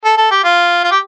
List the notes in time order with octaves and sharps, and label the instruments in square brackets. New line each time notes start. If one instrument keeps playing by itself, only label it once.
[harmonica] A4
A4
G4
F4
F4
G4